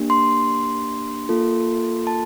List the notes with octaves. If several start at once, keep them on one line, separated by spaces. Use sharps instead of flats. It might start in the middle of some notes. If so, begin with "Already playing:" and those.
Already playing: A#3 D4 G4
C6
A#3 F4 A4
A5